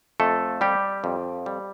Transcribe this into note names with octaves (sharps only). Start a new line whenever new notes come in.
F2 A3 A4
G3 G4
F2
G3